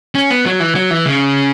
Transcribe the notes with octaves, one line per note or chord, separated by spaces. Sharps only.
C#4
B3
F#3
E3
F#3
E3
C#3